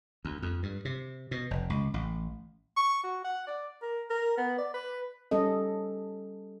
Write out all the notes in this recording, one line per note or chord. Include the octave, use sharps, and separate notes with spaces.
D2
F2
G2
C3
B2
F1
C#2
A1
C#6
F#4
F#5
D5
A#4
A#4
B3
D5
B4
G3 C#4 A4 D#5